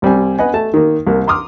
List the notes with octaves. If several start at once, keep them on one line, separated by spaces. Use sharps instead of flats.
C2 G3 C4 G#5
B3 B4 D#5 F#5 G#5
A3 A5
D#3 A#3
C2 A#3
A#5 C6 D6 D#6 F6